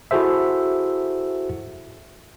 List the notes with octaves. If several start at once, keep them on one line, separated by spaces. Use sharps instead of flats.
E4 F#4 G#4 A4 C5 E5